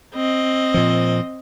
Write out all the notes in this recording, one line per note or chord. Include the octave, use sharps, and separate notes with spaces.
C4 D#5
A#2 F3